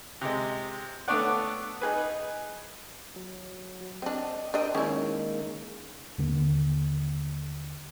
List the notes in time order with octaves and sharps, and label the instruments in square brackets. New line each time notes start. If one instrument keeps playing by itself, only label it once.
[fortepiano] C3 G#3
A3 B3 D4 C#5 D5 F#5
D#4 G#4 B4
[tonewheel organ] F#3
[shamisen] C4 D4 [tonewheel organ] D#5
[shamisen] D4 D#5 [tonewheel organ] A#4 C5 G5
[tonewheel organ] D#3 G#3 A#3 [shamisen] C#4 E4
[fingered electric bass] D#2 D3 G#3 A#3